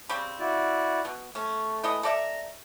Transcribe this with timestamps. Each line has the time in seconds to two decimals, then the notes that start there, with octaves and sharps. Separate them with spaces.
0.09 C#3 G3 C4
0.40 E4 F#4 D5
1.05 B2
1.35 A3 C#4
1.84 E3 A4 D#5
2.03 A4 D5 E5 A#5